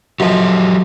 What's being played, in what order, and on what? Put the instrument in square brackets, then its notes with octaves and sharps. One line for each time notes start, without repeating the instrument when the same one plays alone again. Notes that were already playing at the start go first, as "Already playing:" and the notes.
[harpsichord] F#2 F3 [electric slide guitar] F#3 G4 D#5